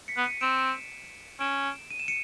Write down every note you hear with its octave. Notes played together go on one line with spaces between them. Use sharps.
B6 C#7
B3
C#7 D#7
C4 D7 E7
C#4 D7 E7
D#7
E7
C#7 D#7